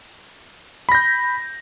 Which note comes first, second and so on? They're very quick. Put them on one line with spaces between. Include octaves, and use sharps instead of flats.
B5 A#6 G6